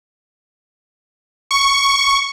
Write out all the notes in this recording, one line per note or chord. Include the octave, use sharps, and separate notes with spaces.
C#6